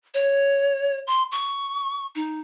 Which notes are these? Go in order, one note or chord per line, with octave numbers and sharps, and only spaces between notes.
C#5
C6
C#6
D#4